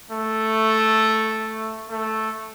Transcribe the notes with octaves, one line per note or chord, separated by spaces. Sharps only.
A3
A3